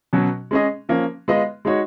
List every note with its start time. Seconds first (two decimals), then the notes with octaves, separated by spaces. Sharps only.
0.13 B2 F#3 C#4 F#4
0.51 G#3 C#4 G#4 D#5
0.89 F3 A#3 C#4
1.28 G#3 B3 F4 B4 D#5
1.65 G#3 D#4 F#4 C#5